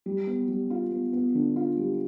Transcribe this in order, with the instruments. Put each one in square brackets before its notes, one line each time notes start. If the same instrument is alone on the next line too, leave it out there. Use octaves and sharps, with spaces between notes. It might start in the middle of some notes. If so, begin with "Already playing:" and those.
[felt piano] G3
B3
G3
F4
B3
B3
D3
F4
G3